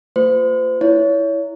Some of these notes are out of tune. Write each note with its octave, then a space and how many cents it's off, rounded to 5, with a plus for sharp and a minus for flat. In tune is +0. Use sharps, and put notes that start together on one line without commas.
A#3 -40 F4 +0 C5 -35
E4 +0 C#5 +25